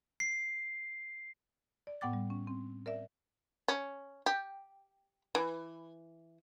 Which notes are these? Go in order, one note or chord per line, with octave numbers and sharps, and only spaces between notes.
C7
D5
A2 B3 F#5 G5 D6 A6
G3
C#4
C4
A#4 D5 E5
C#4
G4
E3